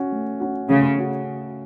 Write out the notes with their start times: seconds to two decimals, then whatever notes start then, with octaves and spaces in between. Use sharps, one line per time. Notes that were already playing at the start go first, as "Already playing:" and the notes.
Already playing: C#4 F#4
0.12 A3
0.40 C#4 F#4
0.69 C#3 A3
0.97 C#4 F#4